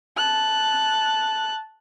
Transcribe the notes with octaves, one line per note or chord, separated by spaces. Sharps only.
A5 F#6